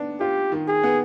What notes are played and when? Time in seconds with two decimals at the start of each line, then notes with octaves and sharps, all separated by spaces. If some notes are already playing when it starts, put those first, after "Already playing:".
Already playing: D#3 B3 D4
0.20 F4 G4
0.52 D#3
0.68 G#4
0.83 B3